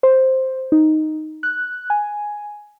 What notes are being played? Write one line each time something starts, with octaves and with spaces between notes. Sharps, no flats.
C5
D#4
F#6
G#5